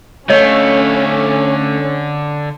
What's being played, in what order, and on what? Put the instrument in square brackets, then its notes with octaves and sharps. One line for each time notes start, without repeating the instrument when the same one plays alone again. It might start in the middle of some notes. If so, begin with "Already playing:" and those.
[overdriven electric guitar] D3 F5 [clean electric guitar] A3 [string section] C#4 [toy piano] C#5 D#5